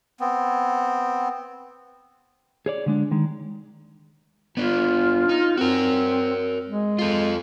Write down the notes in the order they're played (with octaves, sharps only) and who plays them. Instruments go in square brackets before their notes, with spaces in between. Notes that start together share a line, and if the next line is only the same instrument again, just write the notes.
[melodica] B3 C4
[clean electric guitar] G#4 C#5 D5
D3 G#3 D4
D#3 G#3
[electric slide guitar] B3 D4 [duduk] F4
[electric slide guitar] D#4
[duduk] C4 [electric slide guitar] F#4 A#4
[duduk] G#3
[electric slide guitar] F4 A4